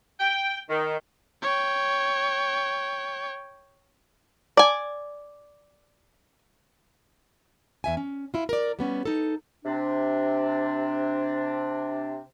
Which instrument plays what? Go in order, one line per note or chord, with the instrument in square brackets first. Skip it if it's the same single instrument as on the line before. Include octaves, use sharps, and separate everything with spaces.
[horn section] G5
D#3
[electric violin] C#5 G5
[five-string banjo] D5 G#5
[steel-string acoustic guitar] E2 E5 G#5
C#4
E4 F4
A#4 D5
G3 B3 C#4
D#4 A4
[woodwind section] C3 D4